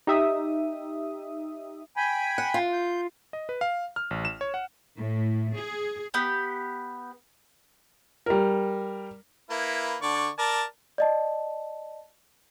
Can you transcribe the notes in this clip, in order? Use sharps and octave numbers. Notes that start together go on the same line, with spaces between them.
D#4 G4 E5 D#6
G5 G#5 B5
F#5
F4
G6
D#5
B4
F5
F6
A1
E7
C#5
F#5
A2
G#4
B3 G4
G3 A#4
A#3 E4 B4
D3 D5 C#6
A#4 D5 A5
D5 D#5 A5